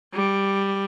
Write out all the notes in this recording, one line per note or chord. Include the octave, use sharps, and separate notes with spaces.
G3